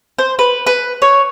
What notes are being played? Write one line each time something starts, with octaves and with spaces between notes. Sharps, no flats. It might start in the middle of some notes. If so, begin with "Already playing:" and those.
C5
B4
B4
C#5